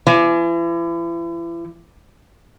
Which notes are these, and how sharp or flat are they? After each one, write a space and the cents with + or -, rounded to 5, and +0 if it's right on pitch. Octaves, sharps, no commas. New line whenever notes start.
E3 +40